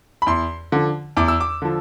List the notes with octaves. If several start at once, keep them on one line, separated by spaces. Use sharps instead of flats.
B5
E2 C6
D3 F3
E2 D6
E6
D6
D3 F3